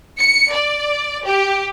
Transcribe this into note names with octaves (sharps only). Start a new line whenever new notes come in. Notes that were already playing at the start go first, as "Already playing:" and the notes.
C#7
D5
G4